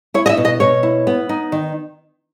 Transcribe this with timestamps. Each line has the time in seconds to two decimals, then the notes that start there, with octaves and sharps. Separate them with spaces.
0.14 E4 C#5
0.26 D#5
0.29 E5
0.37 B2
0.45 D#5
0.60 B2 C#5
0.83 E4
1.07 B3
1.29 D#4
1.52 D#3